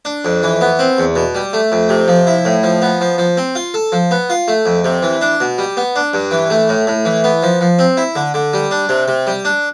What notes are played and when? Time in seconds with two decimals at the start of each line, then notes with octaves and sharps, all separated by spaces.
0.05 D4
0.25 F2
0.43 E3
0.61 B3
0.79 C4
0.98 E2
1.16 B2
1.35 G3
1.53 A3
1.72 F2
1.89 C3
2.08 F3
2.27 E4
2.45 A2
2.63 F3
2.82 B3
3.01 F3
3.18 F3
3.37 C4
3.55 F4
3.74 A4
3.92 F3
4.11 B3
4.30 F4
4.48 A3
4.66 F2
4.84 C3
5.03 E3
5.21 D4
5.40 B2
5.58 G3
5.77 B3
5.96 D4
6.14 G2
6.31 E3
6.50 A3
6.69 A2
6.87 A2
7.05 E3
7.24 B3
7.43 F3
7.61 F3
7.79 C4
7.97 E4
8.15 D3
8.34 D3
8.53 G3
8.71 D4
8.89 C3
9.08 C3
9.27 G3
9.45 D4